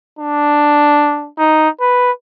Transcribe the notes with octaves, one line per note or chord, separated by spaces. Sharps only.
D4
D#4
B4